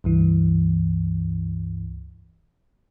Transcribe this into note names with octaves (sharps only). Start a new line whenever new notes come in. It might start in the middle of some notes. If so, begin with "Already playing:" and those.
C#2 G2 E3